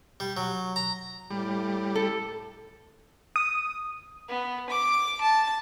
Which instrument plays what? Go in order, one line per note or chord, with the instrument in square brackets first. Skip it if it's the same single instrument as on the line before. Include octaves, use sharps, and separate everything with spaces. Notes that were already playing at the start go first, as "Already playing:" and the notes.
[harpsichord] G3
F#3
A#5
[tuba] A2 [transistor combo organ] G3
[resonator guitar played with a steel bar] A4
[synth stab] D#6
[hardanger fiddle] B3
D6
A5